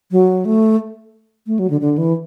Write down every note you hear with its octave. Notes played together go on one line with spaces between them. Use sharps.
F#3
A3
A3
F#3
D3
D3
E3